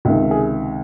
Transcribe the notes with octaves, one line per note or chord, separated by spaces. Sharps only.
C#2 C3 D#3
G#4